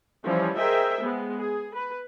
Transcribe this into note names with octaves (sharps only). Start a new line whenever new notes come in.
E3 F3 G3 C#4 E4
G#4 A#4 C5 D#5 E5 G5
G#3 B3
G#4
B4